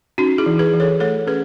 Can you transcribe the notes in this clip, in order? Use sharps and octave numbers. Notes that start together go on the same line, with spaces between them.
C#4 D#4 F#4
E4 G#4
E3
G#4 B4
E3
A4 C#5
A3 A4 C#5
C#4 G#4 B4